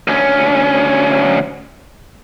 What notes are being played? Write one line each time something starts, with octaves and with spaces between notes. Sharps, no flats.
D2 C#4